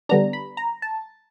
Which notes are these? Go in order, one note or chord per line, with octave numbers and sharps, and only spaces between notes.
D3 G3 B3 D4 A#5
B5
A#5
A5